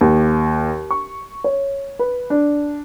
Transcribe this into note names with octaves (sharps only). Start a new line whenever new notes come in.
D#2
C#6
C#5
B4
D4